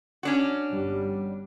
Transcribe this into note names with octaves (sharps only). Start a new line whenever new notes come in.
C#4 D4 F#4
G1 G3